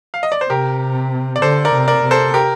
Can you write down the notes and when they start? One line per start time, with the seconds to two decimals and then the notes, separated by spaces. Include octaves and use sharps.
0.14 F5
0.23 D#5
0.32 D5
0.41 C5
0.50 C3 G4 A#4
1.36 D5
1.42 D3 A4 C5
1.65 A#4 D5
1.73 C3
1.88 A#4 D5
2.03 C3
2.11 A4 C5
2.34 G4 A#4